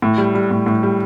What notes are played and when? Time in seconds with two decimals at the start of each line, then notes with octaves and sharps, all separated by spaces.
0.02 A2
0.18 G3
0.35 G3
0.51 A2
0.66 A2
0.83 G3